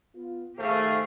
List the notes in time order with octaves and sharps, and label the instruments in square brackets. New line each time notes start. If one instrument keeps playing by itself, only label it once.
[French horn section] B3 F4
[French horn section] D#3 C5 [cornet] A3 [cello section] G4 G#4 F5